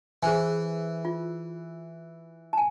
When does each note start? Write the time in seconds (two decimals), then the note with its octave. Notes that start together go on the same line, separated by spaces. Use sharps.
0.23 E3 G#4 C5 G#5
1.05 F4
2.53 G#5 A5